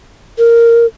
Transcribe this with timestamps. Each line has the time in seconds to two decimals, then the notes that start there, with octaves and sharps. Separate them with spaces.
0.38 A#4